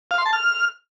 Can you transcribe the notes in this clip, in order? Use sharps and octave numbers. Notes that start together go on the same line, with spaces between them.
F5
C6
A5
F6